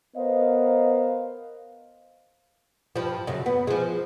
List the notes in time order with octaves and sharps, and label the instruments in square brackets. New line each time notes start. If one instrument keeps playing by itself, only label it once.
[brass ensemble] B3 A#4 C5 D#5 F5
[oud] G2 F3
F#2 C#3
B3
F3 G#3